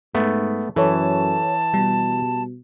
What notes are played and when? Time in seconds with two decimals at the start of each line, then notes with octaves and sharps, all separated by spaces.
0.15 G#2 A3 B3
0.76 F#2 E3 A4 C#5 A5
1.74 B2 G3